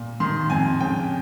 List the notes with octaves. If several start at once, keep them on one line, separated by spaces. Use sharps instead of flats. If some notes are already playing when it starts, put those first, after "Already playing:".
Already playing: A#2
D#3 C6
F2 G#5
C#3 G5